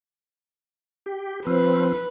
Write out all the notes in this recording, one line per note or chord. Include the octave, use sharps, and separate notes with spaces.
G4
F3 C4 B4